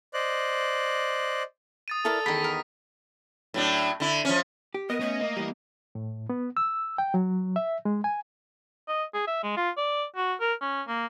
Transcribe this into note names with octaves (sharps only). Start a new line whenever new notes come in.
C5 D5 D#5 F#6
D#6 A6 D#7
E4 A4 A#4 D5
E2 D#3 B5 B6
A#4
A2 F#3 D4
D3 E4
F3 C#4
G4
B3 A#4 D#5
A3 C#4
A#3
E3 G3
A2
B3
E6
G5
F#3
E5
G#3
G#5
D#5
G#4
E5
G#3
F4
D5
F#4
A#4
C#4
A#3